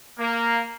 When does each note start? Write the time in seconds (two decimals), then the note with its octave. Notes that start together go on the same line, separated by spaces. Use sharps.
0.18 A#3